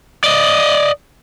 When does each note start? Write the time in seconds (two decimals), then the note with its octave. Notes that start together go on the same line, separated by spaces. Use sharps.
0.24 D5 D#5